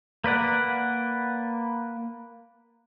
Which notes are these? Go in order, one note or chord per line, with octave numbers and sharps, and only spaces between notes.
A#3 B4 D5 F#5